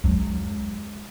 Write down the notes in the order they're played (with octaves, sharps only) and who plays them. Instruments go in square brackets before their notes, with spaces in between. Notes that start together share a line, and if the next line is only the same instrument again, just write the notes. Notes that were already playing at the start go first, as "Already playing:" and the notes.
[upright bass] F#3 G#3